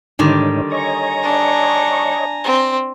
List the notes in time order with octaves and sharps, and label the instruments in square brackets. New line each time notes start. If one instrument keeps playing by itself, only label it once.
[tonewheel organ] G#2 D#4 C#5 [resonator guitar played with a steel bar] D3 D#3 G3
[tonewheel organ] C#5 D#5 C#6 [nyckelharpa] G#5 A#5
[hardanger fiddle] D4
C4